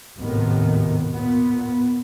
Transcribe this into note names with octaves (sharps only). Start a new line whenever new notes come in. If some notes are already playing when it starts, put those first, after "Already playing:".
G#1 D#2 A2 C3 D#3 B3
A#2 B3